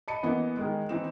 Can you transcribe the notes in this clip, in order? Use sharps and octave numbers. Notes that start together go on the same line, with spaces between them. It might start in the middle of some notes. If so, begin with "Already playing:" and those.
D#5 A5 B5 C#7 D#7
E3 A#3 B3 D#5
D#3 G#3
E3 C4 D#4 E7